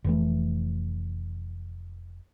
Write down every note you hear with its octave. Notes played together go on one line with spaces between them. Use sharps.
F1 E3 A3